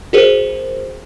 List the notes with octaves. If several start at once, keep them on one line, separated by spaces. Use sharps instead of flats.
F#4 G#4 A#4 C5